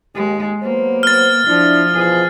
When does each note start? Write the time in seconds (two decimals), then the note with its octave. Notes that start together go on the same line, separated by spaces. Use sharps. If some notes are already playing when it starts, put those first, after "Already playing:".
0.15 D#2 G#3 G4
0.63 F#3 A#3 B3 C5
1.03 F6 A6
1.47 F3 D4 E4
1.95 B2 E3 F3 G#4